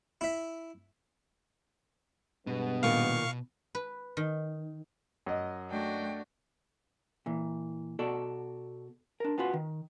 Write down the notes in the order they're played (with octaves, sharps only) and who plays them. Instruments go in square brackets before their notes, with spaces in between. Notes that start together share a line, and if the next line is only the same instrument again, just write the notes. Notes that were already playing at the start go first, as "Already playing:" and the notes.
[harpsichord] E4 E5
[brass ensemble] G2 G#3 B3 [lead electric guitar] B2
[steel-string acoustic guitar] A#2 D#3 [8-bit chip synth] F5 C#6
[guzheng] B4
D#3
[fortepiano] F#2 D#5
[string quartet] A3 G5 [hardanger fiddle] D4 F#4
[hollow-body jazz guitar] A#2 E3
B2 F#4 A4 D5
D4 A#4
B3 C#4 F4 F#4 B4
D#3